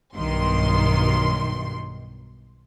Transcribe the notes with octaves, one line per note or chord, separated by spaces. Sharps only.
B1 G2 D#3 C6